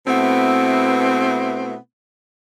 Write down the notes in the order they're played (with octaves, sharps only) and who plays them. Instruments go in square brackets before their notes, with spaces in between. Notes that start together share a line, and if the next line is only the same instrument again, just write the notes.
[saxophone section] B2 A3 B3 C4 E4